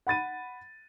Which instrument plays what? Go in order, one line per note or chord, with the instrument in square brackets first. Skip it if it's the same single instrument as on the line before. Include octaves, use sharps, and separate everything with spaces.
[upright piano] F#5 B5 A6 D#7